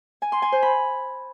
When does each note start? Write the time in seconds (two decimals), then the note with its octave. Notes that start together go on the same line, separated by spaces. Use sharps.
0.22 G#5
0.32 C6
0.42 G#5
0.52 C5
0.63 B5